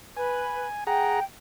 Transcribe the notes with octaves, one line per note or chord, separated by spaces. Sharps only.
B4 G#5
G#4 F#5 G5 A#5